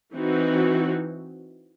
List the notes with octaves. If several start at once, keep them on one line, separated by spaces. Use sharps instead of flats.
E3 C4 D#4 F#4